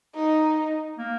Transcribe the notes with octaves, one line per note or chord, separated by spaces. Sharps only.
D#4
A#3